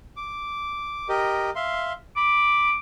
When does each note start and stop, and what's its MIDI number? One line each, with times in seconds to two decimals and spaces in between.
0.17 1.08 86
1.09 1.50 67
1.09 1.50 70
1.09 1.50 75
1.56 1.93 76
1.56 1.93 77
1.56 1.93 84
2.16 2.70 83
2.16 2.78 86